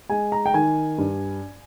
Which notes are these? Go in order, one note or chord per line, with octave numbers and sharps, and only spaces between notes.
G#3 G#5
A#5
G5
D#3 G#5
G2